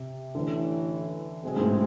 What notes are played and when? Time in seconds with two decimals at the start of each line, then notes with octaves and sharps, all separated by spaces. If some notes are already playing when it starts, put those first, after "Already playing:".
Already playing: C3
0.35 A1 A2 D3 E3
1.43 B1 B2 G#3 C4 G#4
1.57 G#2
1.61 A2